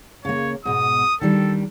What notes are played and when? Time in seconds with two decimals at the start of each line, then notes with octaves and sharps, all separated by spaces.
0.25 C#3 A#3 C#5
0.65 G#2 B2 D#6
1.21 D#3 G3 D4 A4